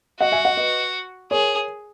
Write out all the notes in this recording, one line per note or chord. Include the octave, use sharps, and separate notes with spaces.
F#4 D#5 F#5
E5 G#5
D#5 F#5
B4 D#5
G#4 A#4 C#5